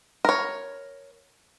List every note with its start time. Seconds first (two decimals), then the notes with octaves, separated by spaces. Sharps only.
0.25 A#4 C#5